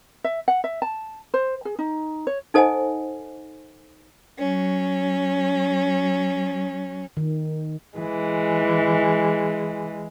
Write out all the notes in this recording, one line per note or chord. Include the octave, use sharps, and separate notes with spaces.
E5
F#5
E5
A5
C5
G#4
D#4
C#5
D#4 A4 C5 D#5 F#5 G#5
F#3 C#4
D#3
E3 G#3